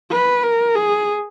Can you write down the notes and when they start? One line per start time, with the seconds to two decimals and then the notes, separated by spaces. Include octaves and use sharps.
0.11 B4
0.43 A#4
0.75 G#4